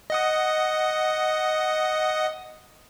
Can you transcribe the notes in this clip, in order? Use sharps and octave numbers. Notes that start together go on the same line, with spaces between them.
D#5 F#5 D#6